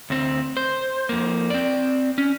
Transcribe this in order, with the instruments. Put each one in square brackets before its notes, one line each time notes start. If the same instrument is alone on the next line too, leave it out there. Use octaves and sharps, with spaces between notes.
[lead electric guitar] D2 C4
C5
F2 A#3
C4 D5
C#4